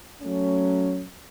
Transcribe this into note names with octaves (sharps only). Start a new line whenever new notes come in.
F#3 A3 C#4